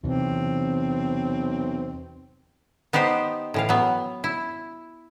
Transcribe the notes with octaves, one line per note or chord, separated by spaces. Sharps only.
B1 E2 C3 E3 C4
B3 D#4 G4 B4 C5
A2 E3 F5
F#3 B3
E4